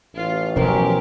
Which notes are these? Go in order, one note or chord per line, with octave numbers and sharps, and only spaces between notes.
A1 F4
B2 F3 F#3 C#4 G4 A#4 C5